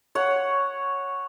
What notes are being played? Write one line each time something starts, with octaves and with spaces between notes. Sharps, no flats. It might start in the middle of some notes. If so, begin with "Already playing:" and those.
C#5 F#5